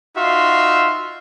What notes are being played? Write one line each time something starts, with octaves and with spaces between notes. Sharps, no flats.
D#4 F4 F#4 E5 F5 C6